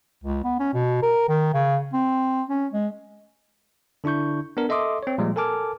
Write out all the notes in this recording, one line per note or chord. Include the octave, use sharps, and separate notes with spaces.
C#2
B3
C#4
B2
A#4
D#3
C#3
C4
C#4
G#3
D3 D4 E4 C#6 G6
B3 D4 A#4
A4 D#5 E5 C6 D6 D#6
C4 C#5
A#2 F3 G3 G#3
A4 A#4 G#5 A5 D6 F6